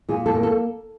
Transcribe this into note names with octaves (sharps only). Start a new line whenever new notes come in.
A#2 G#4
A4
A#3
A4